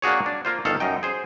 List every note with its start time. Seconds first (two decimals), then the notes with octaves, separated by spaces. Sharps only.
0.02 A#3 D4 F#4 G#4 C#5
0.26 D4
0.45 A#3 F4 C5
0.65 G1 D#3 A4 F5
0.80 F#2 D#4 G5
1.03 G#4 C5